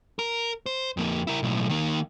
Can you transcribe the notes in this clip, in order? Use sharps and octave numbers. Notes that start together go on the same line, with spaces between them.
A#4
C5
F2 A#3
E4 A#4
B1 A2
D#3 A#3